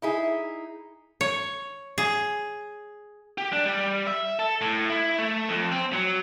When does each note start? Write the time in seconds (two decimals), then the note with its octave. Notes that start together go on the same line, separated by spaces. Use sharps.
0.02 D#4 E4 G#4
1.21 C#5
1.98 G#4
3.38 G4
3.53 D4
3.65 G3
4.07 E5
4.39 A4
4.61 A2
4.90 E4
5.18 A3
5.49 F2
5.71 C4
5.93 F#3